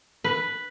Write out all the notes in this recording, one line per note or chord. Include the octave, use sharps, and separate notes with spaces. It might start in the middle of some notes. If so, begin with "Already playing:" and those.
B4